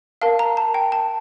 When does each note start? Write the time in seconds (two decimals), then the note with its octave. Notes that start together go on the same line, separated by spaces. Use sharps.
0.22 A#4 F5 A5
0.39 A#5
0.57 A5
0.74 G5
0.92 A5